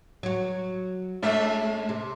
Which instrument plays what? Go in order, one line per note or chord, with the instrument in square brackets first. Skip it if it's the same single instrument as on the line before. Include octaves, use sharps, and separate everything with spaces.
[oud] F#3 F#4
[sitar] G#3 C#4 E5 [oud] A3 D4 E4
[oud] C3